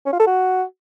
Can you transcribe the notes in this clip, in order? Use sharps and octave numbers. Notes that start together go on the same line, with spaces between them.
C#4
F4
A4
F#4